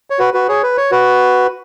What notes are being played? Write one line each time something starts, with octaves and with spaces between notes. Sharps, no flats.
C#5
F#4 B4
F#4 B4
G#4 C#5
B4
C#5
F#4 B4